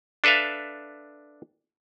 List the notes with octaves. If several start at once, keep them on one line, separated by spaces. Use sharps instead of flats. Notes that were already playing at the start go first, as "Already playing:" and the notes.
D4 A4 B4 E5 F5